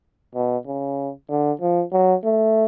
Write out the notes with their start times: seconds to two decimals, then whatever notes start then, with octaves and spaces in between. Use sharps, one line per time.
0.35 B2
0.67 C#3
1.30 D3
1.61 F3
1.93 F#3
2.24 A3